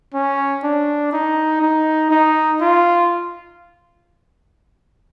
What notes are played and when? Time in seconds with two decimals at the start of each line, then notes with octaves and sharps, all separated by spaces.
0.14 C#4
0.64 D4
1.13 D#4
1.62 D#4
2.11 D#4
2.61 F4